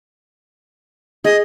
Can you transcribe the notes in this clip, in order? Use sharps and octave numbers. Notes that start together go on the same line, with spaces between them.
G#4 D#5